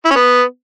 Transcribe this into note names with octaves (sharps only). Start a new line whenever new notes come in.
E4
C#4
B3